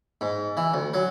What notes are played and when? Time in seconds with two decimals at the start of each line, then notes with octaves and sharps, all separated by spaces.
0.21 G#2
0.57 E3
0.74 D2
0.94 F#3